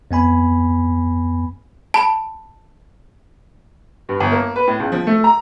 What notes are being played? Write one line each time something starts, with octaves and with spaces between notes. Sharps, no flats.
F2 B3 G#5 B5
A5 B5
G2
G1
A#3
B4
A2
C#2
F3
A3
A#5